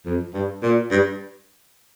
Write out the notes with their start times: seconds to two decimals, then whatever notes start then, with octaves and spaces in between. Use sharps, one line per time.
0.05 F2
0.34 G2
0.62 A#2
0.91 G2